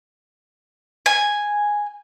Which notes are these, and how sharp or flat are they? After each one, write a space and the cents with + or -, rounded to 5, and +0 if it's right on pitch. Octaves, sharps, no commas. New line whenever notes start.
G#5 -5